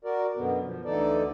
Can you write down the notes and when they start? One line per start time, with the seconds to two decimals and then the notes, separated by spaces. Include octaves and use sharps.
0.05 F#4 A#4 D5
0.37 F#2 B2 D3 B3
0.64 F3
0.85 D2 D3 E3 D#4 A4 D5